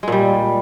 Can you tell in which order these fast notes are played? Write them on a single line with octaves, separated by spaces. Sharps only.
G#3 A#2 G3